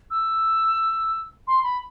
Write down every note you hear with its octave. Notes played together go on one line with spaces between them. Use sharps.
E6
C6
B5